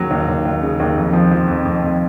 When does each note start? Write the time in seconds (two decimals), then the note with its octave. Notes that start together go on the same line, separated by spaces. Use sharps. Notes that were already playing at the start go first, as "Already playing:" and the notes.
Already playing: D#2 C#3 F#3
0.11 D#2
0.28 D#2
0.45 D#2
0.62 C#3
0.80 D#2
0.97 F2
1.13 F3
1.31 F3
1.48 F2
1.65 F2
1.82 F2